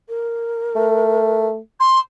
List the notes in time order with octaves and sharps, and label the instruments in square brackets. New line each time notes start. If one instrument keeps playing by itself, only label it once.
[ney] A#4
[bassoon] A3
[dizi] C6